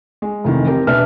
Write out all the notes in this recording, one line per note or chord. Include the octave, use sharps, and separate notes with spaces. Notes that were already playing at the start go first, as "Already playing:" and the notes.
G#3
F1 D#3 E3
C4 G4 A#4
E1 D4 B4 E5 F6